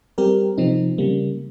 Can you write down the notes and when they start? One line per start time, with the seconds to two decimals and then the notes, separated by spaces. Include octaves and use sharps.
0.18 G3 C4 G4 A#4
0.58 C3 F3 C4 D#4
0.98 C#3 G3 A#3